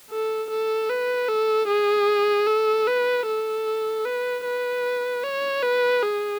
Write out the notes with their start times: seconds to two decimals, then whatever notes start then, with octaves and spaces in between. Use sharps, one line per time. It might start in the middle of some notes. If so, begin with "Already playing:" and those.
0.11 A4
0.50 A4
0.89 B4
1.29 A4
1.68 G#4
2.47 A4
2.87 B4
3.26 A4
4.05 B4
4.45 B4
5.23 C#5
5.63 B4
6.03 G#4